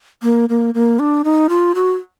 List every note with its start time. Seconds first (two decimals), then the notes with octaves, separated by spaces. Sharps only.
0.23 A#3
0.49 A#3
0.74 A#3
0.99 D4
1.24 D#4
1.49 F4
1.75 F#4